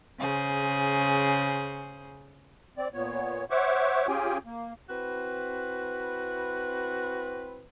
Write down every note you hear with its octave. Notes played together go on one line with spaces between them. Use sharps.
C#3 G#4 C5
C4 D5
A#2 B3 C#5
C5 C#5 E5 F#5 C#6 D6
C#4 F4 G4 G#4 G5 G#5
A#3
C4 E4 F#4 B4